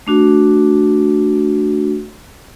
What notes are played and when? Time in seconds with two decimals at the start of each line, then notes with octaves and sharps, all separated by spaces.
0.07 A3 D4 F#4